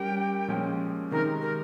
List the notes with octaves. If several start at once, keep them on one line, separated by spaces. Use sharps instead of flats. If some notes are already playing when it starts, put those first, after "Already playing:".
Already playing: G3 C#4 G4 A#4 G5
A#2 F3 G#3 C#4
C3 D#3 G#3 D#4 A#4
A#4